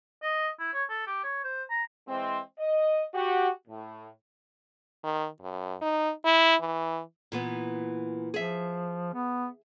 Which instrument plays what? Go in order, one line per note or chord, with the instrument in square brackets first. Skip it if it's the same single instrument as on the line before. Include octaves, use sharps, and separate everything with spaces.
[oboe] D#5
E4
C#5
A4
G4
C#5
C5
A#5
[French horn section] E3 G#3 C4
D#5
F#4 G4
A2
[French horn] D#3
F#2
D#4
E4
E3
[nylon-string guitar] A#2 E3 B3
[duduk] F3 [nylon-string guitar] G#4 E5
[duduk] B3